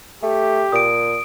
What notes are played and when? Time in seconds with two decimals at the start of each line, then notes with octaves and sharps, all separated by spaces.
0.23 A3 G4
0.72 A#2 D#6 D7